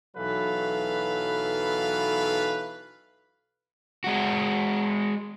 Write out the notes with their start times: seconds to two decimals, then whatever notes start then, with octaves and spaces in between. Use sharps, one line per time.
0.17 B1 E3 F#3 A4 B4 F5
4.04 G#3 F#4